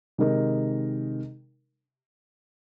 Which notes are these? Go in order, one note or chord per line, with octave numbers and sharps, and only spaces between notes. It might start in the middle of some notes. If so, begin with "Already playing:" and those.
C3 D#3 G#3 D#4 A#4